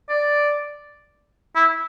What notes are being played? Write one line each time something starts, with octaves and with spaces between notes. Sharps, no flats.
D5
E4